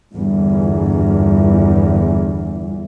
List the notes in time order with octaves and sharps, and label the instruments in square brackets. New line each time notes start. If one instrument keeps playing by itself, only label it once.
[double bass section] G1 E2